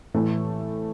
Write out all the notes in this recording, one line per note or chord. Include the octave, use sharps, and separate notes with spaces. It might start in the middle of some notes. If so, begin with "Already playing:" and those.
A2 E3 A3